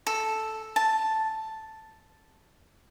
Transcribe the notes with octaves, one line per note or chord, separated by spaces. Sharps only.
A4
A5